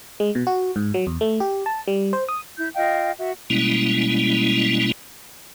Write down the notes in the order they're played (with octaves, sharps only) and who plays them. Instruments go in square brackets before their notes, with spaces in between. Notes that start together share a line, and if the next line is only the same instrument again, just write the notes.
[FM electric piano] G#3
B2
F#4
G#2
F#3
E2
A3
G4
A5
G3
C5
D#6
[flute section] E4 G6
F4 D#5 F5 G5
F#4 E5
[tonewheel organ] B2 G3 G#3 A#3 C#4 E4